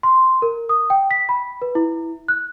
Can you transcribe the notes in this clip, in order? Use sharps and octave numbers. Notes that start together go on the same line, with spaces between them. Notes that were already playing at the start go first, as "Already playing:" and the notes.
C6
A#4
D#6
G5
B6
B5
B4
E4
F#6